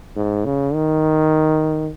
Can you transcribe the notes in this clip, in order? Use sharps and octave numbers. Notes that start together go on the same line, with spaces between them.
G#2
C#3
D#3